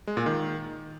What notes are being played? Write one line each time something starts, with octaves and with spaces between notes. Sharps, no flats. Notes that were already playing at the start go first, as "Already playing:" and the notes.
G#3
A#2
D#3